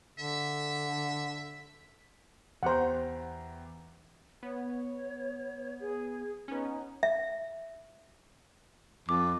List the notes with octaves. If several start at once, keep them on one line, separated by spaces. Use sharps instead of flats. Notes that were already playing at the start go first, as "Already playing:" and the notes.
D3 E5
E2 G4 C5 F#5 A#5
B3 C#5
G#4
B3 C#4 D#4
E5
F2 D6